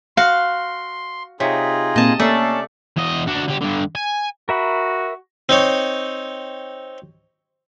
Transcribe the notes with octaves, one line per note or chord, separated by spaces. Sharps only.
F#4 F5 C6
C3 D#4 F4 G#4 C#5 B6
A#2 A#3 C4 D#5 A5
A3 A#3 C#4 A4 D5 A#5 C7
E2 D#5
D4 F#4
D3 G4
G2 D3
G#5
F#4 A#4 E5 B5
C4 D#4 C#5